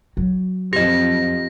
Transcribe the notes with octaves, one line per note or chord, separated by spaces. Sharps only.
F#3
F2 F3 G4 D#5 A#6